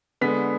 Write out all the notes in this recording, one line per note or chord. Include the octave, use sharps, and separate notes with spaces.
D3 G#3 B3 B6